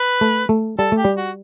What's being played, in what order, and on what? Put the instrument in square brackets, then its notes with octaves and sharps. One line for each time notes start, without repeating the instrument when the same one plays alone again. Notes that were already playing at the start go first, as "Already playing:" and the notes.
Already playing: [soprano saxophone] B4
[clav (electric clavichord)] A3
A3
[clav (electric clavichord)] G3 [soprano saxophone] A4
[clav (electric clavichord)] A3
[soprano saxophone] G4
[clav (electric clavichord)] G3
[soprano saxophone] F#4